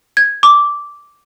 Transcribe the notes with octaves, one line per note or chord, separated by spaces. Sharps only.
G#6
D6